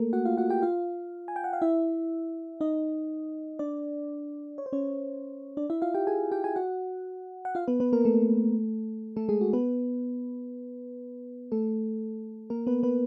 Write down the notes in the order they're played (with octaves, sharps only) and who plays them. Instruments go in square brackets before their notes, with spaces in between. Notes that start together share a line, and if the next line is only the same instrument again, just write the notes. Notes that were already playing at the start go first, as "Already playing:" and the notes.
Already playing: [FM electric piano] A3 A#3 A4 A#4
F#4 F#5
F4 F5
F#4 F#5
G4 G5
F4 F5
G#5
G5
F#5
F5
E4 E5
D#4 D#5
D4 D5
C#5
C5
C#4 C#5
D4 D5
E4 E5
F4 F5
G4 G5
G#4 G#5
G4 G5
G#4 G#5
F#4 F#5
F#5
F4 F5
B3 B4
B3 B4
A#3 A#4
A3 A4
A3 A4
G#3 G#4
F#4
B3 B4
A3 A4
A#3 A#4
B3 B4
B3 B4